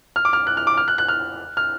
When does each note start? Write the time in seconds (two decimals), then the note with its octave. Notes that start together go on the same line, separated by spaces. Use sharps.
0.16 F6
0.25 D6
0.33 F6
0.47 F#6
0.57 F6
0.67 D6
0.77 F6
0.88 F#6
0.98 F#6
1.08 F6
1.57 F6